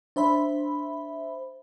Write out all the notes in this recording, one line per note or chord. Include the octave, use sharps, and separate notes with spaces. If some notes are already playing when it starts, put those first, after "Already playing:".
D4 C5 E5 B5